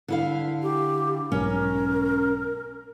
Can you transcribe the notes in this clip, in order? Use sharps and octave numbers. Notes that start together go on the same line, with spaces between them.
D3 E4 F5
G4
B1 G#2 C#4 A#4